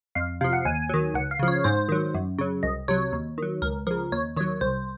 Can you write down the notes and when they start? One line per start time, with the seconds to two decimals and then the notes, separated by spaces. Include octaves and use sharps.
0.15 F2 F5
0.41 C3 F5
0.44 F3
0.53 F#5
0.65 D#2 G#5
0.89 D#3 F#3
1.14 C#2 F#5
1.31 F5
1.39 C#3 F3
1.48 C#5
1.64 G#2 C5
1.89 D#3 F#3
2.14 F#2
2.38 C#3 F#3
2.63 C2 D#5
2.88 C3 F#3 C#5
3.13 D#2
3.38 D#3 F#3
3.62 C#2 A#4
3.87 C#3 F3 A#4
4.12 D#2 C#5
4.36 D#3 C#5
4.40 F#3
4.61 C2 C5